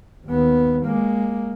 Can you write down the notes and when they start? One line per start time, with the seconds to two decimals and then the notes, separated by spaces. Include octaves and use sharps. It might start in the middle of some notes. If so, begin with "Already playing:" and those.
0.26 D#2 B3
0.86 G#3 A#3